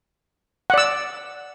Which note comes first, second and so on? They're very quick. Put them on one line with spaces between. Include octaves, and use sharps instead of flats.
F#5 D5 E6